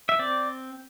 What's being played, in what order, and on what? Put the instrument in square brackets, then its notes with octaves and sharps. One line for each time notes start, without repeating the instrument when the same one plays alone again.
[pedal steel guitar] E5
C4 D5